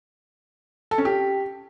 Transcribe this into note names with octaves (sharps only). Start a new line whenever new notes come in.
A4
C#4
G4